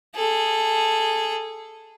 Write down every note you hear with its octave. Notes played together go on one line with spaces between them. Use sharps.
G#4 A4